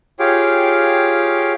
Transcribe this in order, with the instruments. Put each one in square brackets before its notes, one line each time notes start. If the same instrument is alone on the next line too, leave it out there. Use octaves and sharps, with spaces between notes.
[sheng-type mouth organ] F4 G4 G#4 C#5 F5 G5